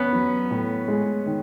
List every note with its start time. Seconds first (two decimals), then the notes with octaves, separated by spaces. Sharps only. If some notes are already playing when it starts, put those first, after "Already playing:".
Already playing: B3 C#4
0.13 F#3
0.51 A2
0.88 G#3
1.26 D#3